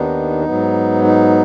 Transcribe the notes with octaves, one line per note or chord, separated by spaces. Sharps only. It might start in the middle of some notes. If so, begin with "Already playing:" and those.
Already playing: D#2 D#3 B3 D4 D#4
G#2 F#3 B3
D#4